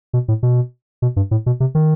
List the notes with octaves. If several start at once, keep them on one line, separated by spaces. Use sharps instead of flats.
B2
A2
B2
B2
G2
A2
B2
C3
D#3